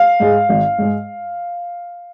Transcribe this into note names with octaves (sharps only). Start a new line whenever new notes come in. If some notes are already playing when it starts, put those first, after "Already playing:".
Already playing: F5
G#2 G#3
G#1
G#2 G#3